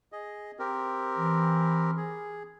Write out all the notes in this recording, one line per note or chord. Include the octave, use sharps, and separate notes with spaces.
G#4 D#5
C4 G4 A#4
E3
G#4